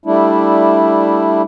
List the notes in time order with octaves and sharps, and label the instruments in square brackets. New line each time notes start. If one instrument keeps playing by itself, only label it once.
[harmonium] G3 A3 D4 E4